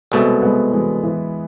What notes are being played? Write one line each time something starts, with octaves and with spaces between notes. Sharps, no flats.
C2 B2 G#3 A3 B3
G#3 B3
E3 G#3
E3